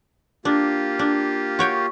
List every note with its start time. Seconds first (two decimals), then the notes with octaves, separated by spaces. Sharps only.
0.45 A#3 D4 F4 G4
0.99 D4
1.59 F#4 C#5 G5